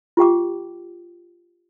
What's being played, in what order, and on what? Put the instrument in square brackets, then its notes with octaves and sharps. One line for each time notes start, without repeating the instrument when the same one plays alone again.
[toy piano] F4 G4 G5 D6